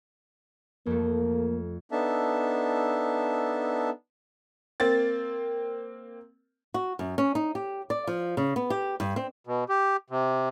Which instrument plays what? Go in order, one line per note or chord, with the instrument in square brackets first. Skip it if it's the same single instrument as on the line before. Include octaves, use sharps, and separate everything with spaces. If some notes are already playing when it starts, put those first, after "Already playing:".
[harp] F2 A3 [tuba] A#3
[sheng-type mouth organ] B3 D4 D#4 A4 E5 A5
[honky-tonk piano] A#3 C4 A6
[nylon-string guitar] F#4
F#2
C#4
D#4
G4
D5
F3
C#3
B3
G4
G2
C4
[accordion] B2
G4
C3